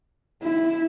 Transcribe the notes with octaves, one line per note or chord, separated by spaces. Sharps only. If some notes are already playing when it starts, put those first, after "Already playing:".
E4